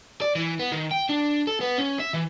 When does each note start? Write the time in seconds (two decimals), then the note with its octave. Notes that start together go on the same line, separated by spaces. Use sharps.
0.21 D5
0.35 E3
0.60 B3
0.72 D#3
0.92 G5
1.10 D4
1.47 A4
1.61 B3
1.78 C#4
1.99 E5
2.13 E3